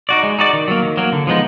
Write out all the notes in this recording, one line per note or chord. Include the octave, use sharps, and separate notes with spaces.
D#4 F#4 D5
G#3
D#4 F#4 D5
D#3
F#3 A#3
D#3
F#3 A#3
D3
F3 G#3 B3 D#4